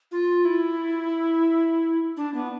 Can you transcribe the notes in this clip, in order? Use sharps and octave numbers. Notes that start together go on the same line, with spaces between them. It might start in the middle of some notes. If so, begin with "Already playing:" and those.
F4
E4
D4
B3